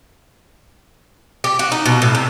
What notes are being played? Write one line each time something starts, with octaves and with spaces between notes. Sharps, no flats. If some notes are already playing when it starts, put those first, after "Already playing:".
G4
F#4
D#4
B2
A2
C3